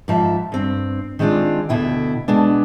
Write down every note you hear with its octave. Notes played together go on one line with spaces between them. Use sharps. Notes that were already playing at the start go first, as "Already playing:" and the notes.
G#2 F3 C#5 E5
G2 C4
D#3 G#3 C4 D4 F4
D2 B2 E4 G5
B2 G#3 B3 D4